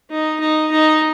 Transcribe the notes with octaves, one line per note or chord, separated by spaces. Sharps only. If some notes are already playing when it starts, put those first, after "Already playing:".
D#4
D#4
D#4